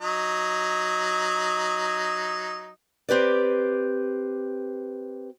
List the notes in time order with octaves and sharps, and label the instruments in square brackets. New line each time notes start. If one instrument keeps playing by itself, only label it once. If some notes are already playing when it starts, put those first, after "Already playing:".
[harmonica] F#3 D#4
[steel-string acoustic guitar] C4 G4 B4 D5